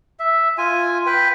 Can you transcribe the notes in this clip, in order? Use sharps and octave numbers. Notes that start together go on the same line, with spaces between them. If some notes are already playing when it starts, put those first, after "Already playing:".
E5
F4 G#5
B4 G5